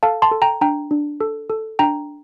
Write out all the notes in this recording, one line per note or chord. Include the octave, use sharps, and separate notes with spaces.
A4 F5 A5
A5 C6
A4
G5 A#5
D4 G5 A#5
D4
A4
A4
D4 G5 A#5